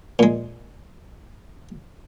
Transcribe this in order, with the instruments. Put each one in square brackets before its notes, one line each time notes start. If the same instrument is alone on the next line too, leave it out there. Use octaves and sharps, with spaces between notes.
[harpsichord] A#2 G#3